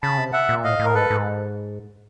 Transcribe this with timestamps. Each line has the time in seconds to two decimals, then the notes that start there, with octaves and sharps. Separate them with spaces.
0.03 C#3 A5 B5
0.18 C3
0.33 E5 F#5
0.49 A#2
0.64 A2 D#5 F5
0.79 A2
0.85 A#4
0.94 G#2 A4 B4
1.10 G#2